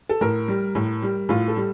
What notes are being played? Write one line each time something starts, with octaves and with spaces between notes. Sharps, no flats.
A4
A2 A#4
G3
A2
G3
A2 F4
A4
G3